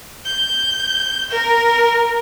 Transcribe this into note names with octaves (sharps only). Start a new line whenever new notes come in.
G6
A#4